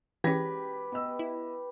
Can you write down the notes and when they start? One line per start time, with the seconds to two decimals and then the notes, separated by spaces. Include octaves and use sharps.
0.24 E3 C#4 G4 B4 G#6 A#6 B6
0.92 B3 D#5 E6
1.19 E4